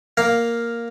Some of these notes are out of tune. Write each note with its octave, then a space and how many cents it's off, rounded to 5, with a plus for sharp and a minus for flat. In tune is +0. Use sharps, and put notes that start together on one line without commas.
A#3 +0 F5 +0